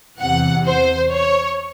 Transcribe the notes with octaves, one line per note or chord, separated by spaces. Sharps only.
E2 C3 E3 F#5
C5
C#5